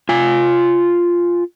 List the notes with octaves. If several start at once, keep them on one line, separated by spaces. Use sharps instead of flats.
F4 G#5